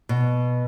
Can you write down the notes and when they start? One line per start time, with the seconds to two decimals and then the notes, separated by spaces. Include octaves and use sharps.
0.09 B2